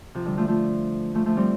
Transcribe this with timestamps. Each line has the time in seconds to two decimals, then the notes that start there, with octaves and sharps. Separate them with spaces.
0.15 C3 F3
0.26 D3 G3
0.37 F3 A3
0.48 F3 A3
1.14 F3 A3
1.26 F3 A3
1.37 G3 C4